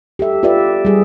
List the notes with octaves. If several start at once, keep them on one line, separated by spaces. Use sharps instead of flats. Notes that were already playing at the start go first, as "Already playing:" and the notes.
G4 A4 E5
F4 G4 B4 D5 E5
G3 G#4